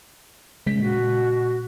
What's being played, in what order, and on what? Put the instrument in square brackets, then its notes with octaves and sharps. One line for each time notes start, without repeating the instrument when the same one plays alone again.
[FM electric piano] C#3 G#3 B6
[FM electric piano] A#2 [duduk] F#4